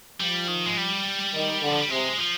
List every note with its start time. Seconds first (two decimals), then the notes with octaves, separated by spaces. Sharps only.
0.20 F3 G3
0.48 D#3
0.66 G#3
0.77 G3
1.34 D#3
1.62 D3
1.71 F3
1.80 G3
1.90 C3 G#3
2.18 F3